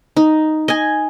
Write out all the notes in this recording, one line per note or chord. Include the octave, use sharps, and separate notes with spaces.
D#4
D#5 G#5